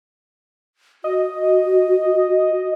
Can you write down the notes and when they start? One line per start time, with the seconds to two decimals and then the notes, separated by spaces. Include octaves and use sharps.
1.04 F#4 D#5